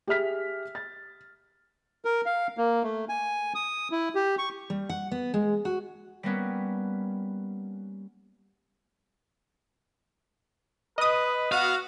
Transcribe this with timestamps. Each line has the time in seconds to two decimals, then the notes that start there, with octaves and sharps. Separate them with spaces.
0.08 G4 G#4 E5 F6 B6
0.75 A6
2.05 A#4
2.26 F5
2.57 A#3
2.83 A3
3.09 G#5
3.55 D#6
3.92 E4
4.15 G4
4.38 C#6
4.70 G3
4.89 F#5
5.11 B3
5.34 G#3
5.65 F#4
6.23 G3 A#3 B3 C#4
10.98 B4 D#5 D#6
11.52 B3 F#4 F5